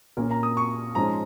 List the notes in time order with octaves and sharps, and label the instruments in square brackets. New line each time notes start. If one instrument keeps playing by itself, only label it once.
[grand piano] A#2 A#3 C#4 A#4
[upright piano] A#5
D#6
C#6
[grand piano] G#2 F3 G#3 C#4 [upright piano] A#5